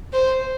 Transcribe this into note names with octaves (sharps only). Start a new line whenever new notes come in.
C5